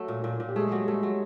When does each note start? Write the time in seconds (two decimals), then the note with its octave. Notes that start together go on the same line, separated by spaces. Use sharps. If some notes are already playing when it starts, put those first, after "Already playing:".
Already playing: F#3 A3
0.08 A#2
0.24 A#2
0.40 A#2
0.48 G4
0.56 G#3 A3 G#4
0.71 F#3 G3 G4
0.87 G#3 A3 G#4
1.03 F#3